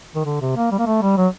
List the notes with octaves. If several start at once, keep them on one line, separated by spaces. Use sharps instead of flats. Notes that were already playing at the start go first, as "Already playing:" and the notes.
D#3
D3
C3
A#3
G3
A#3
A3
G3
F#3